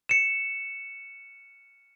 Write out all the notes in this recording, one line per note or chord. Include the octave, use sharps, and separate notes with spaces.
C#7 E7